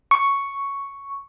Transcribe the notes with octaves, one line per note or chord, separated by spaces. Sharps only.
C#6